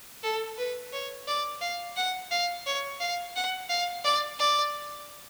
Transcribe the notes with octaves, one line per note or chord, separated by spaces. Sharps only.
A4
B4
C#5
D5
F5
F#5
F5
C#5
F5
F#5
F5
D5
D5